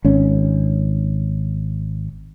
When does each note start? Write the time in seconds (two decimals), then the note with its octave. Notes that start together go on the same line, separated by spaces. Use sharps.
0.05 G#1 C#4